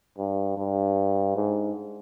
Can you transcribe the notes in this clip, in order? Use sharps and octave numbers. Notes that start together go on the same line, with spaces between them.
G2
G2
G#2